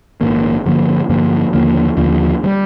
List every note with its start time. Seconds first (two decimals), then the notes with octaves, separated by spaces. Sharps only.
0.21 A#1 G#2 D#3 A#3
0.66 G2 D3 F3 A#3
1.09 G2 D3 F3 A#3
1.53 D#2 D3 F3 A#3
1.97 D#2 D3 F3 A#3
2.44 D#3 G3